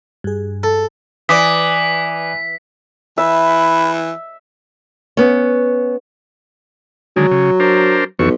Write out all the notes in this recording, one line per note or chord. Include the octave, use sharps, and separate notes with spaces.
G2 G#4
A4
E3 D5 D6 D#6 B6
E3 E5 B5
B3 C#4
D3 D#3 F#3 G#3
C#3
D4 A#4 C5
B1 F2 E3 C#6